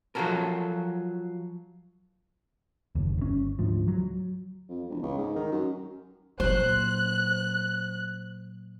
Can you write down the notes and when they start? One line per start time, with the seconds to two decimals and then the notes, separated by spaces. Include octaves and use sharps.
0.15 F3 F#3 F4 F#4 A4 A#4
2.95 F#1 D#2
3.18 G1 C#4
3.59 D2 G#2 F3
3.88 F#3
4.69 F2
4.90 E1
5.03 C#2
5.18 G#2
5.36 D#3
5.52 F#2
6.40 A#2 F#3 C5 F#6